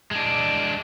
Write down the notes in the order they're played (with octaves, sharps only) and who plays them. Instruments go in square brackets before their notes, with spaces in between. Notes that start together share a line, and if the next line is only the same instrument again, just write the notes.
[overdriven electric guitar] G#3 D4